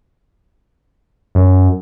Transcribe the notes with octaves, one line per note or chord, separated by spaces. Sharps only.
F#2